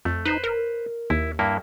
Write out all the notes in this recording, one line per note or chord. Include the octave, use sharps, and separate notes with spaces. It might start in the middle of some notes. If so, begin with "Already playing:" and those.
F2 A3
D#4 B4 C5
A#4
D#2 E4
G2 A#3 E4